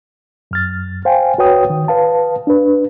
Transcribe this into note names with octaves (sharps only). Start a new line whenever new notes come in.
F#2 F6 A6
C5 F5 G5 G#5
C#2 F#4 B4 C#5 G5 D#6
D#3
B4 F5 A5
D4 B4